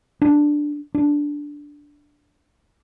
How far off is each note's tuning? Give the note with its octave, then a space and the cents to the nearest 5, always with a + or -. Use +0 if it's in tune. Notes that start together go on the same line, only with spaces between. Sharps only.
D4 +5
D4 -5